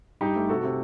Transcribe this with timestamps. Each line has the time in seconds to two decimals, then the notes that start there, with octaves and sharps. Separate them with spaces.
0.21 G2 D#4 G4
0.36 A3
0.49 C3 F#4 A4
0.63 C3